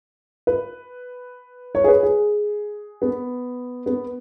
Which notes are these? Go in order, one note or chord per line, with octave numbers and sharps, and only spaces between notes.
B4
C#5
G#4
B4
G#4
B3
B3